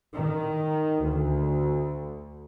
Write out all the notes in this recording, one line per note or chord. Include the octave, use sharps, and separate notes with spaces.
D#3
D2